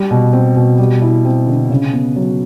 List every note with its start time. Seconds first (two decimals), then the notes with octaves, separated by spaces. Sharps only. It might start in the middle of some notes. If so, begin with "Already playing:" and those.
Already playing: G3
0.11 B2
0.33 C4
0.56 B2
0.78 G3
1.02 E4
1.25 C4
1.47 D3
1.70 C#3
1.93 B3
2.16 F#3